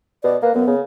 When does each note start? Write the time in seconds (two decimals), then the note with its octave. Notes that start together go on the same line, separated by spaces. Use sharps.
0.24 B2 D5
0.42 A#3 B4
0.55 F#2 B3
0.67 C#3